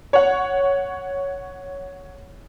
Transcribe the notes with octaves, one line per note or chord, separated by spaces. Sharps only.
C#5 F#5